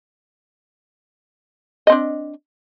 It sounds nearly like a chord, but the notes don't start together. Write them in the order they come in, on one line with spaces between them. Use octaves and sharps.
D#5 C4 D4